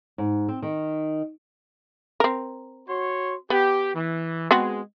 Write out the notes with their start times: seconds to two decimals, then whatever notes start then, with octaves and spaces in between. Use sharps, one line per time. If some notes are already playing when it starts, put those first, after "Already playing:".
0.18 G#2
0.48 C4
0.62 D#3
2.20 C4 A#4
2.88 F#4 C#5 C6
3.50 B3 G4
3.95 E3
4.51 G#3 B3 C4 F#4